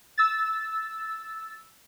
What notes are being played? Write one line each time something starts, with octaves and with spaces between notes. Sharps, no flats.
E6 A6